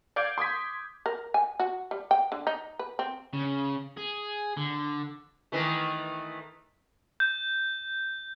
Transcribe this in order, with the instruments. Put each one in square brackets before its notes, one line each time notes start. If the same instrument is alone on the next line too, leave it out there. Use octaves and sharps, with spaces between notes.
[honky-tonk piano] D5 F5 D6 G6 G#6 D7
C6 D#6 G#6 B6
[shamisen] A#4
G#5
F#4
G3
G5
D3
D#4
B4
C4
[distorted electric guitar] C#3
G#4
D3
[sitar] D#3 E3 A3
[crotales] G6